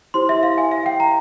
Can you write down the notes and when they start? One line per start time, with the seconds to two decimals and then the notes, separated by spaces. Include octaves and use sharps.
0.14 E4 G4 C5 C6
0.29 E5
0.43 F5
0.58 G#5
0.72 F5
0.86 G5
1.00 A#5